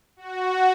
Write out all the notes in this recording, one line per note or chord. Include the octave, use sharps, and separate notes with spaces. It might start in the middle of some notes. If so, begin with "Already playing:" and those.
F#4